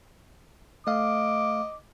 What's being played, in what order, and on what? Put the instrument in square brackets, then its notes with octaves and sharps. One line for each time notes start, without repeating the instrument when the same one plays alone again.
[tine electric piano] A3 F5 [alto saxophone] D#5 [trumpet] D6